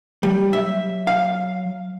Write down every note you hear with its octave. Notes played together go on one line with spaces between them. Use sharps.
F#3 G3
E5
F5